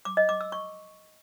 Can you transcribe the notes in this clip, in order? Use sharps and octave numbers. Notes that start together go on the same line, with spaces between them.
D6
D#5
D6
E6
C#6